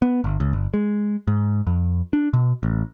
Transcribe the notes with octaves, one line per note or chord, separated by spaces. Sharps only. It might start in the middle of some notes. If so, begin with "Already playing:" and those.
B3
G1
C#2
G1
G#3
G#2
F2
D4
B2
A1